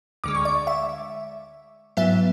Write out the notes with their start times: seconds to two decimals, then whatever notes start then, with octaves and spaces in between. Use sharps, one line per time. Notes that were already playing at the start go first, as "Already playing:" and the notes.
0.24 D2 D3 G#3 D6
0.35 C#6
0.45 D5
0.67 E5
1.97 G#2 F#3 B3 E4 E5